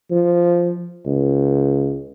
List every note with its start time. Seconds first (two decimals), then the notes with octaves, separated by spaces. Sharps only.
0.11 F3
1.06 C#2